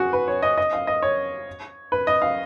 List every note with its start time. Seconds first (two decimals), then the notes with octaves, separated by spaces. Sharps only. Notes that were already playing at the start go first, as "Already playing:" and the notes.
Already playing: F#4 G#4
0.13 B4
0.28 C#5
0.43 D#5
0.58 D#5
0.73 F5
0.87 D#5
1.02 C#5
1.92 B4
2.07 D#5
2.22 F5